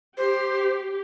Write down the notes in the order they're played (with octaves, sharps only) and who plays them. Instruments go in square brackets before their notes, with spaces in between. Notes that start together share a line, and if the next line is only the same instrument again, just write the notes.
[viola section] G4 [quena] C5